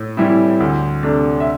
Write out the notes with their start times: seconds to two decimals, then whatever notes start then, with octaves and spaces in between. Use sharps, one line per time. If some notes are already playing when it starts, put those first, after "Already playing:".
Already playing: A2
0.17 E3 G3 C4 E4
0.60 D2
1.03 C3 A3 D4
1.40 E5